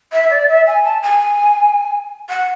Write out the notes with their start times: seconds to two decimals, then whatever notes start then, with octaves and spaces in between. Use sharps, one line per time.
0.13 E5
0.30 D5
0.49 E5
0.67 G#5
0.84 A5
1.02 G#5
2.29 F#5